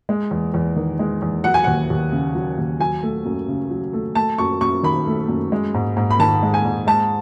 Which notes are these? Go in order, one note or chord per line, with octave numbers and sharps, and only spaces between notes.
G#3
E2
E2
D#3
G#3
E2
F#3 F#5
G#5
D#2 F#5
D#2
C#3
F#3
D#2
F#3 G#5
A3
F#2
C#3
F#3
A3
A3 A5
F#2 C#6
F#2 C#6
D#3 B5
A3
F#2
G#3
G#2
G#2
B5
D#3 A5
G#3
G#5
G#2
G#3 A5